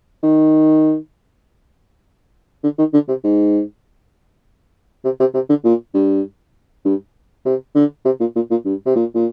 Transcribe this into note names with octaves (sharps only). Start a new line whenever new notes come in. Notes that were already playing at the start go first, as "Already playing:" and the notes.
D#3
D3
D#3
D3
C3
G#2
C3
C3
C3
D3
A#2
G2
G2
C3
D3
C3
A#2
A#2
A#2
G2
C3
A#2
A#2